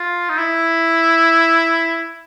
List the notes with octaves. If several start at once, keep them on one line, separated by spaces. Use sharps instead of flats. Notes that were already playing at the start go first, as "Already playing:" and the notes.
Already playing: F4
D#4
E4